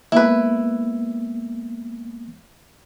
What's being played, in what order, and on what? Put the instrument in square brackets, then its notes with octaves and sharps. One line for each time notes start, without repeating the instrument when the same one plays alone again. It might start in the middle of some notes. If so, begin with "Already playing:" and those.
[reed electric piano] G#3 A#3 B3 [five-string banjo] E4 B4